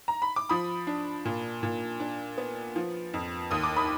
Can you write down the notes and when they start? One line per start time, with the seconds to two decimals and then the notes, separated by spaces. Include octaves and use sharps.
0.08 A#5
0.22 B5
0.36 D6
0.49 F3 B5 D#6
0.87 D4
1.25 A#2
1.63 A#2
2.00 D4
2.38 B3
2.76 F3
3.14 F2
3.51 D#2 D#6
3.63 D6
3.76 B5 D#6